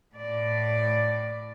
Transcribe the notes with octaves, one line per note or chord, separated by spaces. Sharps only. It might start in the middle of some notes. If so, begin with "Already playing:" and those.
A2 D5